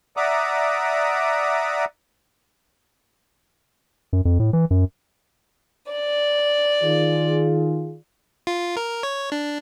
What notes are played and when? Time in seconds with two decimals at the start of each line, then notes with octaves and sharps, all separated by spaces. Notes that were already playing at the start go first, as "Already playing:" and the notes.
0.17 D5 E5 F#5 A#5 D6 D#6
4.13 F#2
4.25 F2
4.40 A2
4.53 E3
4.71 F#2
5.91 D5
6.81 D#3 F4 G#4
8.47 F4
8.77 A#4
9.03 C#5
9.32 D4